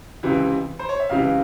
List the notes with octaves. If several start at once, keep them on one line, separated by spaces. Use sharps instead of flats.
C#2 C3 E3
C5
C#5
E5
C#2 C3 E3 F5